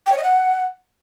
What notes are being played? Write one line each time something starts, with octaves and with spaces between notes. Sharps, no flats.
G5
C#5
D#5
F#5